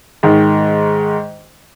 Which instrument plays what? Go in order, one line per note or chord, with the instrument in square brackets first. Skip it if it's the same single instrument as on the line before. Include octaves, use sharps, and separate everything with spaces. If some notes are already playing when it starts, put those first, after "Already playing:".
[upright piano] G#2 D#3